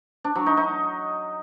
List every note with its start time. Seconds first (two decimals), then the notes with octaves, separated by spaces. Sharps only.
0.24 D4
0.35 F#3
0.46 D#4
0.57 D#4